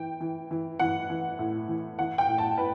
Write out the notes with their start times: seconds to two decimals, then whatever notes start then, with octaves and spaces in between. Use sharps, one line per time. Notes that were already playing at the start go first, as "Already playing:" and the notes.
Already playing: E3 G5
0.20 E3
0.51 E3
0.79 E3 F#5
1.10 E3
1.39 A2
1.68 E3
1.99 E3 F#5
2.18 G5
2.29 A2
2.38 A5
2.58 A2 B4